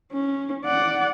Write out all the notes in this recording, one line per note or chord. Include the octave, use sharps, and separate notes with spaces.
C#4
D5 F#5